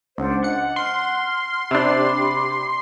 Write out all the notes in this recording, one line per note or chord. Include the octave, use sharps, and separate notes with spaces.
C#2 D4 C5 F#5
D#5 F#5 C#7
C6 F6
C3 D4 G4 B5 D6